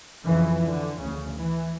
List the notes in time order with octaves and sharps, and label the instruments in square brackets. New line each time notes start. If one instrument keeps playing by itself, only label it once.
[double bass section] F2 C#3 E3
D3
D2 C#3
E3